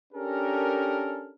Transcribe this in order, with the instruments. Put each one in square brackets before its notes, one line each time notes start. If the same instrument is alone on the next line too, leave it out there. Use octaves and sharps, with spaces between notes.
[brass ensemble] C#4 D4 G4 A4 A#4